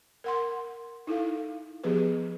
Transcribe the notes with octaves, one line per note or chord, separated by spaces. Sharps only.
A#4 F#5 C6
D#4 E4 A4 F5
F3 B3 G4 G#4 B4